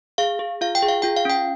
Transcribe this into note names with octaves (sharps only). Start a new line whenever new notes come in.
G#4 F5
G#4
F4 F5
G5
G#4
F5
F4 G5
F5
C#4 G5